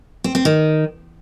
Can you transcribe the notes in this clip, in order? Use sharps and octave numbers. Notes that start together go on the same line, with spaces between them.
C4
C4
D#3